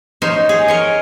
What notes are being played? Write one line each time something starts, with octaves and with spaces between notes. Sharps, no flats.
D#4 C5 C#5
G#4
A#4 C#5 D#5